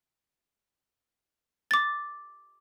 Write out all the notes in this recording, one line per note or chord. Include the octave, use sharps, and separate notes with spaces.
D6 A6